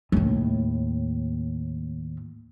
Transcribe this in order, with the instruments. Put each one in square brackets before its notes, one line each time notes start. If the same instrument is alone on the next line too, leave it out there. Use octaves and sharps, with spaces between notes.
[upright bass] D#2 A2